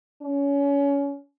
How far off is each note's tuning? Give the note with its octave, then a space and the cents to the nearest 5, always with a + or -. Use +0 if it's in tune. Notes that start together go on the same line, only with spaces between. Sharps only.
C#4 +25